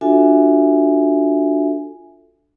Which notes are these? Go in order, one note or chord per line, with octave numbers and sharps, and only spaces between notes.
D4 F4 F#4 A4 E5 G#5